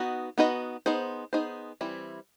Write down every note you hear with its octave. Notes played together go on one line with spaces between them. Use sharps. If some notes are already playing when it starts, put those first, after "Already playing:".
Already playing: B3 D#4 F#4 B4 D#5
B3 D#4 F#4 B4 D#5
B3 D#4 G#4 C5
B3 D#4 G#4 C5
E3 G3 C4 E4